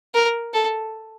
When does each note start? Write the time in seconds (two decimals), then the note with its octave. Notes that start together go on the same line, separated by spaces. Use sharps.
0.14 A#4
0.54 A4